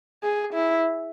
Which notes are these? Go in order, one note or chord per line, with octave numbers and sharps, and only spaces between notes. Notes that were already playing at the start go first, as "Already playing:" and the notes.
G#4
E4